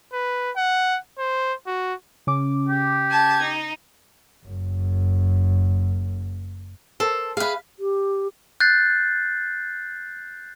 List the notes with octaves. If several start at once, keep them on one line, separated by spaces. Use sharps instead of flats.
B4
F#5
C5
F#4
C#3 C#4 D6
G4
A5 G#6
D#4
F#1 F#2
A4 A#4 C5
G#4 B4 E5 F5
G4
F#6 G6 A6 C7